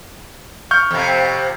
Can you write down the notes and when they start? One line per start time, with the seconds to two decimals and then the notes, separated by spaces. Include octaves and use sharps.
0.71 C#6 F6 G6
0.91 F2 C3